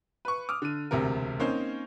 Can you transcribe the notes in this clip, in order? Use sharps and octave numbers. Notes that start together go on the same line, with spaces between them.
B4 C#6
D6 D#6 F6
D3 D#7
E1 D2 C3 A#4
A#3 C4 C#4 D#4 C5